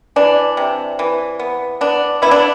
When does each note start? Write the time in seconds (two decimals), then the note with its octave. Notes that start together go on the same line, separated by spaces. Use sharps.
0.16 E3 D4
0.57 C3
0.99 E3
1.39 B3
1.81 B3 D4
2.22 B3 E4
2.31 D4